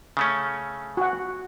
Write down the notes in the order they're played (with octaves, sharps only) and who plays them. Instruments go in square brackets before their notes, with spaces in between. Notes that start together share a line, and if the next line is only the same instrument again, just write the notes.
[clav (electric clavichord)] C#3 A3 C#4
[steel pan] F#4 F#5